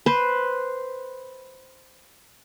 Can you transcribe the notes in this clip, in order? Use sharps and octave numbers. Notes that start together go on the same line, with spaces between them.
B4 C5